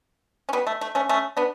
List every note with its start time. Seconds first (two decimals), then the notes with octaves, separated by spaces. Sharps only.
0.49 C#4
0.53 G3 B3
0.67 A3
0.81 A3
0.95 A3 C#4
1.09 A3 C#4
1.37 B3 D4